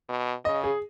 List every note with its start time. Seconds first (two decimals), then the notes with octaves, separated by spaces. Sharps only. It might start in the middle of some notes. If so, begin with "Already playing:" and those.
0.08 B2
0.45 C#3 D#5
0.64 G#4